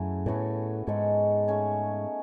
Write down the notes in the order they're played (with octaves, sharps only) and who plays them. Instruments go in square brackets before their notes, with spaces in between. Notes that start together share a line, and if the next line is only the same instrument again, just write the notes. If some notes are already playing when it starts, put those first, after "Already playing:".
Already playing: [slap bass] F#2 [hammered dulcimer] C#3 F#3 A3 E4
[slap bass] A2 [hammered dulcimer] E3 B3 F#4 A4
[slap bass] G#2 [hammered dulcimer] G#3 D#4 A4 C#5
[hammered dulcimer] A3 C#4 G#4 C#5